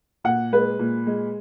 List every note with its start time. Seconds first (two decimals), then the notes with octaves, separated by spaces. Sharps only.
0.24 A#2 F#5
0.53 G#3 B4
0.79 A#2
1.07 G#3